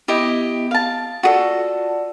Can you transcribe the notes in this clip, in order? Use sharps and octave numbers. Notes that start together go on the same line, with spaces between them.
B3 E4 G4 D#5
F5 A5
F4 F#4 G#4 A4 D5 A5